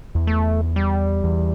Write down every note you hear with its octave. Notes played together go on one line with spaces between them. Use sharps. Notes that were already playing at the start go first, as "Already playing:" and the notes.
E2
A3
G3
E2